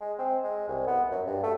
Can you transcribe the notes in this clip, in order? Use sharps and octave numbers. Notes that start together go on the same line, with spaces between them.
G#3
C4
G#3
C2
B3
F#2
G2
A3